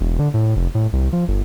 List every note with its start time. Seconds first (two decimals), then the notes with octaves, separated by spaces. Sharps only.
0.01 E1
0.19 D3
0.34 A2
0.56 F1
0.75 A2
0.93 C2
1.13 F3
1.28 G1